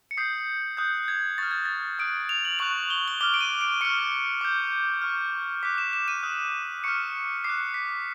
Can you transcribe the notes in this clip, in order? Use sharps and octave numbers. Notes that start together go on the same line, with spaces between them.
C#7
D#6 G6 C7
D#6 F#6 G6
G#6
C#6 F6 A6
G#6
A6
D#6 F#6 D7
F7
F#7
C#6 F#6 F7
G7
G7
D6 F6 G7
D7
D#7
D7
C#6 F6 C#7
D6 G6
C#6 F6
D6 F#6 B6
E7
E7
D#7
D#6 F#6
C#6 F6 C#7
D6 F#6 C7
B6